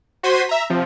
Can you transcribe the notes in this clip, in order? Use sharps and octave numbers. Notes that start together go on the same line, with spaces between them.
F#4 C5 C6 G#6 B6 D#7
E5 A#5
C3 F3